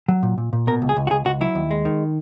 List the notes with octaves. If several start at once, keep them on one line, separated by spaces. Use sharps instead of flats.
F#3
A#2
A#2
A#2
B2 A#4
C#2
G#4
C#2
F#4
C#2 G#4
C#2 F#4
F#3 E4
D#2
G#3
D#3